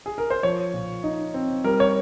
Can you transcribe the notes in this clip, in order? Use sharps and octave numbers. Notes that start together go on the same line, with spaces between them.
G#4
A#4
C5
F3 C#5
A#2
D#4
C4
G3 A#4
C#5